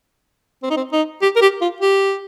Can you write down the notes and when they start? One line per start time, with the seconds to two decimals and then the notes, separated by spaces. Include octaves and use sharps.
0.63 C4
0.70 D#4
0.77 C4
0.92 D#4
1.22 G4
1.36 A#4
1.41 G4
1.61 F4
1.81 G4